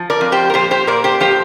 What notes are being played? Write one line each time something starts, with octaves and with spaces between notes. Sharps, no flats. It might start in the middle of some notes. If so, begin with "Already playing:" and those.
Already playing: F3
A#4 D5
F2
G4 C5
A#4
A#2 G4 C5
G4 C5
A#2 A#4 D5
G4 C5
F3 G4 C5